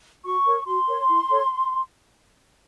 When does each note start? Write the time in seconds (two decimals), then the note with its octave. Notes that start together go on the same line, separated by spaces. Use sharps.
0.25 F#4 C#6
0.46 A#4 C#5
0.67 F#4 C6
0.87 A#4 C#5
1.09 E4
1.29 A4 C#5